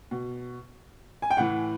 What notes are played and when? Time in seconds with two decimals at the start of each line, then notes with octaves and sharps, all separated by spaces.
0.11 B2
1.22 G#5
1.30 G5
1.37 A2 E3 F#5